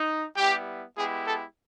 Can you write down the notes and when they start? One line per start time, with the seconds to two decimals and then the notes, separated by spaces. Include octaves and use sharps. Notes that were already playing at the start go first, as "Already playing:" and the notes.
Already playing: D#4
0.36 G3 B3 E4 G4
0.97 G#3 B3 E4 G4 G#4
1.27 A4